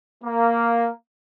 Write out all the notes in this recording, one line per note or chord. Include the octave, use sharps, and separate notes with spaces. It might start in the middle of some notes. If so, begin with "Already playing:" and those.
A#3